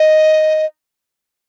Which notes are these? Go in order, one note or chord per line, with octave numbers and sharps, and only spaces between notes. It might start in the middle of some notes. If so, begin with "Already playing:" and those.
Already playing: D#5